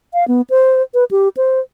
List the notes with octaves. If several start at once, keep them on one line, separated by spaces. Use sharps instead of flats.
F5
B3
C5
B4
G4
C5